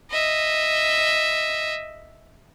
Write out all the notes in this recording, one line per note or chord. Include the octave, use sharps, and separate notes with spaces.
D#5 E5